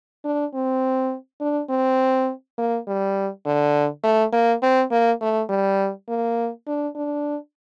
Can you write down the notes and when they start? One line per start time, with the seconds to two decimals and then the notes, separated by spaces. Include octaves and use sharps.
0.25 D4
0.54 C4
1.41 D4
1.70 C4
2.58 A#3
2.87 G3
3.46 D3
4.03 A3
4.33 A#3
4.63 C4
4.91 A#3
5.21 A3
5.49 G3
6.08 A#3
6.67 D4
6.95 D4